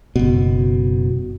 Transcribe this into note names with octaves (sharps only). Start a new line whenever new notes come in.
F#1 B2